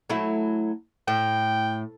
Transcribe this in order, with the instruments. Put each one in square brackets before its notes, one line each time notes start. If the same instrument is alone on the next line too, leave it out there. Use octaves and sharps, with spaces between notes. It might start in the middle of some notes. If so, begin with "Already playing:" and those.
[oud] F#3 A3 E4
[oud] A2 [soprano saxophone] G5